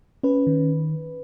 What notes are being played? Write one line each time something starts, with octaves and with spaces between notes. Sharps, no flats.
C#4 B4
D#3